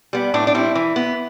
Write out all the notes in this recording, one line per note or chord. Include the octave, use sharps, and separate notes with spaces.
G3 B3
A2 D4
D4
G3 C4 E4
E3
B3